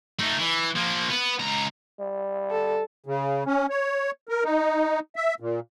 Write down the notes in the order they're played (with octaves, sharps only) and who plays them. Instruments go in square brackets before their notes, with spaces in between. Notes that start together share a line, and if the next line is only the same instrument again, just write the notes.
[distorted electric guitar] A3 D#4
E3
F3 A#3
B3
C#2 A#5
[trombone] G3
[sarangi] A4
[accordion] C#3
C#4
C#5
A#4
D#4
E5
A#2